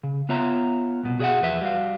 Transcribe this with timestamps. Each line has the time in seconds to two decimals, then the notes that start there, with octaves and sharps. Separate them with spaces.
0.03 C#3
0.29 B3 F4 C#5 E5 A#5
1.03 C2 B2
1.19 F#4 G#4 C#5 D#5 E5 F#5
1.41 E2 F3 B4 E5
1.61 G3 F#4 F5